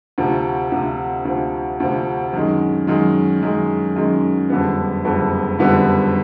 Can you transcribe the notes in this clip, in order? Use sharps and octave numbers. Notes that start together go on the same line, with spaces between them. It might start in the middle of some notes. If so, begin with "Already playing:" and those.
D2 C3 F3
D2 C3 F3
D2 C3 F3
D2 C3 F3
F#2 D#3 G#3
F#2 D#3 G#3
F#2 D#3 G#3
F#2 D#3 G#3
F#1 F2 D3 G3 B3
F#1 F2 D3 G3 B3
F#1 F2 D3 G3 B3